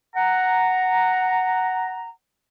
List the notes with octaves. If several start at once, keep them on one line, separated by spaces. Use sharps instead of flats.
F#5 A#5